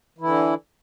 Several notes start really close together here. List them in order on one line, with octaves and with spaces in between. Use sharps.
E3 E4 D3